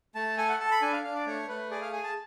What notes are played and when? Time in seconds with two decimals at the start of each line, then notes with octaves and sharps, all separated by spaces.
0.15 A3 A5
0.37 A4 G#5
0.49 F#5
0.60 A4 A5
0.71 B5
0.82 D4 G#5
0.93 F5
1.04 D4 F5
1.15 D5
1.26 A3 C#5
1.48 A3 B4
1.70 G#4 D5
1.81 F5
1.92 G#4 G#5
2.04 A5